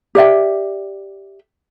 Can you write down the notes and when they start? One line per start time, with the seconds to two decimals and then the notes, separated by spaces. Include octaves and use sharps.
0.15 G4 D5 E5 G5